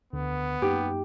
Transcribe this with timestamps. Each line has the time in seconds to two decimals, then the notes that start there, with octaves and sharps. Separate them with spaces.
0.13 D2 D3 B3
0.62 F#2 A#3 D#4 G4